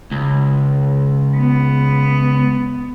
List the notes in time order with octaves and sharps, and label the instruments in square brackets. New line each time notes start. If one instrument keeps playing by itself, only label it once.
[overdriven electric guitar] C#2
[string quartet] B3